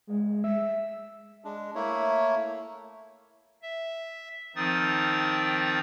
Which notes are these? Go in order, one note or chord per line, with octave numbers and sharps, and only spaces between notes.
G#3
E5
G#3 D4
A3 A#3 E4 C#5
E5
D#3 F3 C4 D#4 D#6 A6